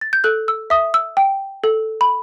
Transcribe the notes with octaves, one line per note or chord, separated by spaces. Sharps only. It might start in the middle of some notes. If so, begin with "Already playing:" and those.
A6
G6
A4 F#6
E6
E5 D#6
E6
G5
A4
B5